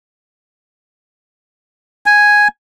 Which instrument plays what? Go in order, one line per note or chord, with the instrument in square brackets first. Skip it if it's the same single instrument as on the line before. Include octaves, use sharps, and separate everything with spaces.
[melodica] G#5